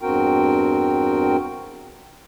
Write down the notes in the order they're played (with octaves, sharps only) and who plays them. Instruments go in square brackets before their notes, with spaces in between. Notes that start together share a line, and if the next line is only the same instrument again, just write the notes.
[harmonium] E2 G2 C4 F#4 A#4 G5